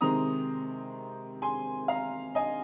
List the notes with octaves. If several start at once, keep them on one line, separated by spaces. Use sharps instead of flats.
C3 D#3 G#3 C4 A#5 D#6
G#5 C6
F5 A#5
D#5 G#5